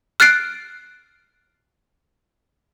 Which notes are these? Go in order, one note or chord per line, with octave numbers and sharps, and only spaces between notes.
F6 F#6 A6 C7 D7